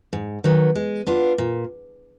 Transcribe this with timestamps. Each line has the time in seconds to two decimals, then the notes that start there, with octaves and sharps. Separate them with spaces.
0.13 G#2
0.44 D#3 F#3 B3
0.75 G#3
1.07 B3 D4 F4
1.38 A#2